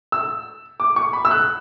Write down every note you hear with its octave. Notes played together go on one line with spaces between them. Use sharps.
E6
D6
C#6
B5
E6
F#6